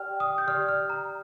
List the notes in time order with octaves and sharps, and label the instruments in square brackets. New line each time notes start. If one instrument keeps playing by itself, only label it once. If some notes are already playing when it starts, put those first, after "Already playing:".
Already playing: [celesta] G4 D5 G5 F6
D#6
G6
G4 D5 F6
F6
A#5